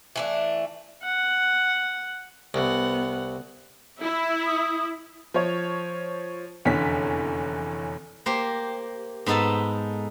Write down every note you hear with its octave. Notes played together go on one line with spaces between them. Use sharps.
E3 A3 D4
F#5
C2 B3 F#5
E4
D#6
F3 C#5
F1 E2 D3 C#4 B6
A#3 G4 C5
G#2 B3 D#4 A4 A5